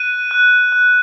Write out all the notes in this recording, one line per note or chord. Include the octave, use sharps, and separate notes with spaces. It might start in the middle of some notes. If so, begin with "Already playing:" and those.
Already playing: F#6 D#7
F#6
F#6